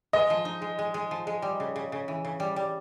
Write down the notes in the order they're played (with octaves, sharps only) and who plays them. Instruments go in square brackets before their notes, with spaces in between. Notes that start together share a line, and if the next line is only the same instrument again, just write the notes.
[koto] G#3 [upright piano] D#5
[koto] F3
D#4
G#3
G#3
G#3
F3
G#3
G3
C#3
C#3
C#3
E3
C#3
G3
G3